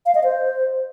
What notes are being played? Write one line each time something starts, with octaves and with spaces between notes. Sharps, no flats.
F5
D#5
C5